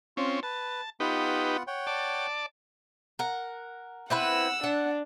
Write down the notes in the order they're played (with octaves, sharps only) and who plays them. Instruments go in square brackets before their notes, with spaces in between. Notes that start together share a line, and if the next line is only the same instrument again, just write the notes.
[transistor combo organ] C4 C#4 [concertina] F4
[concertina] B4 [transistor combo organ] A5
[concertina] B3 F4 F#5 [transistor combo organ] D#4 G4 B4
[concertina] C#5 F#5 G5
[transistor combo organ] D5 A5
[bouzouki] A#4 F#5
[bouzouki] C4 E4 B4 [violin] F#5 E6
[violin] D4 [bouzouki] F#5